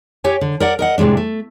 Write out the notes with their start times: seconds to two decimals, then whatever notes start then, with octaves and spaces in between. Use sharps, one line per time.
0.24 G4 C#5 G#5
0.41 D3
0.60 A#4 D5 F#5
0.79 A#4 D#5 F#5
0.98 A2 C3 E3 G#3 D4
1.17 A3